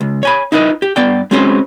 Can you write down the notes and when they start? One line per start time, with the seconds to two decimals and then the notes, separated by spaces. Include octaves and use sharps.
0.01 C#2
0.23 C#5 G#5 B5
0.52 D#4 E4 A#4 B4 D#5
0.82 G4
0.96 G2 B3 D5 G5
1.31 G#3 C4 C#4 F#4 B4 C5